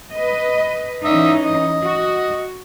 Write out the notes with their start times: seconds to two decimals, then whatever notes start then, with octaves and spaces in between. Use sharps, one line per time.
0.11 B4 D#5
1.05 E3 C#4 D#4 E5 D#6
1.43 D#5
1.84 F#4